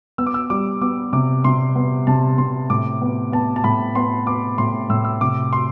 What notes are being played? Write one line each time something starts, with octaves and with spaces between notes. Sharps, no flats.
B3 E6
D6
E6
G3 D6
B3 D6
C3 D6
C3 C6
B3
C3 A5
C3 C6
A2 D6
B3
B3 A5
A5
A2 B5
B3 C6
B3 D6
A2 C6
A2 E6
E6
C3 D6
C6